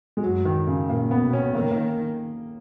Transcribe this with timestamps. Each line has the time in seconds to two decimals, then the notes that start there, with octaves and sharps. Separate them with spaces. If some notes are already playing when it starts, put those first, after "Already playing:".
0.17 G#3
0.23 F#2 F#3
0.45 D#3
0.67 C#3
0.89 A#2 A#3
1.11 B3
1.22 B2
1.33 C#4
1.54 D#3 A#3
1.71 A#3